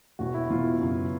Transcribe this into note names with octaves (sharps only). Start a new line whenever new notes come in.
E1 E2 B2 F#4
E4
E1 E2 B2 F4
F#2 C#3 F#3 B3